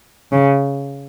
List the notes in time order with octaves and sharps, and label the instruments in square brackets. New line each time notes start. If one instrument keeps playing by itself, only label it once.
[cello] C#3